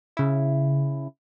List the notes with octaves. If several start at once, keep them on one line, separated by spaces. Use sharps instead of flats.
C#3 E4